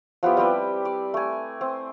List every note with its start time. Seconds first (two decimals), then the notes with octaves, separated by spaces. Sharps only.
0.23 F3 B3 E4 G4
0.37 G3 C4 G4 B4
0.85 D5
1.14 A3 G#5
1.61 C4